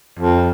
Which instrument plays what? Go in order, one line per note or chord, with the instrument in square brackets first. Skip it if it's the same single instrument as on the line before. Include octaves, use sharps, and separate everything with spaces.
[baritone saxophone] F2